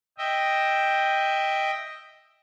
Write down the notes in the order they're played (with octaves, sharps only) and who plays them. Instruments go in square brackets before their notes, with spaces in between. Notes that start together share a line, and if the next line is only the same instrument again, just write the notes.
[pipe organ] D#5 E5 G5